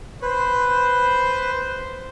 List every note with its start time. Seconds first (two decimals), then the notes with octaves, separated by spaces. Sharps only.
0.22 B4 C5